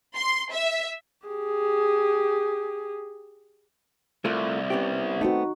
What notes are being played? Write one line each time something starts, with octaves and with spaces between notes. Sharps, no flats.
C6
E5
G4 G#4
C2 A3 F4 A#4
B3 C#4 G4
A3 B3 C4 D#4 F#4